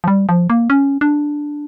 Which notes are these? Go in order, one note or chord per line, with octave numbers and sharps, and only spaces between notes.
F3
G3
F3
A#3
C#4
D4